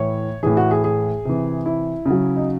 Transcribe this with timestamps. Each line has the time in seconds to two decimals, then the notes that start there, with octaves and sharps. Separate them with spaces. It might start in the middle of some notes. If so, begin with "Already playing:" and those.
Already playing: A2 E3 C#5
0.43 A2 E3 G#4
0.57 F#4
0.71 G#4
0.84 G#4
1.25 C3 E3
1.66 E4
2.06 C#3 F#3
2.36 D#4